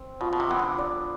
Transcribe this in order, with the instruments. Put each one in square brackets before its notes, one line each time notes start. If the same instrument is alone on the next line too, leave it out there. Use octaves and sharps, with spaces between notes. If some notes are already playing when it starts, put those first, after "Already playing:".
Already playing: [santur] C4
[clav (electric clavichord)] B2 [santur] F4
[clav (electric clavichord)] B2
C3
[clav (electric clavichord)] E3 [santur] B3
[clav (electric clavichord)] D3
[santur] D5